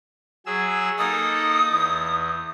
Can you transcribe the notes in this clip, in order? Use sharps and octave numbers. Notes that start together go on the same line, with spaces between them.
F#3 G#4 E6
A#3 D#4 A4 D#6
E2